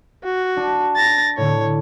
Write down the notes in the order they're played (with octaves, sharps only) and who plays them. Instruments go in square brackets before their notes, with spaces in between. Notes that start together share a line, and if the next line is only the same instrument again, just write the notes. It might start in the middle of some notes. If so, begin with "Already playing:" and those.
[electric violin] F#4
[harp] D4
[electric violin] A6 A#6
[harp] A2 D3 [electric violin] C#5